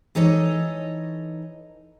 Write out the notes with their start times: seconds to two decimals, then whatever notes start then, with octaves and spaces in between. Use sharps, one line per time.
0.15 E3 D#4 A4 C#5 D#5